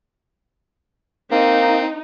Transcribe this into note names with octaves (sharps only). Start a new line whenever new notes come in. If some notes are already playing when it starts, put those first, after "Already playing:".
A#3 C4 D#4